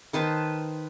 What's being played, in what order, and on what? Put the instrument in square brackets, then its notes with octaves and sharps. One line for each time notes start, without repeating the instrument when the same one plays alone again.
[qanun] D#3 B4 C5 A5